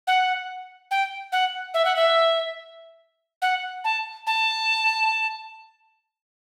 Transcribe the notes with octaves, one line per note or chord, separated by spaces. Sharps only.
F#5
G5
F#5
E5
F#5
E5
F#5
A5
A5